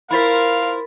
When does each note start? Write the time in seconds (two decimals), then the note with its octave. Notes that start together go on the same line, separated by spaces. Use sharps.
0.11 E4 F4 A#4 C5 F5 B5 A6 B6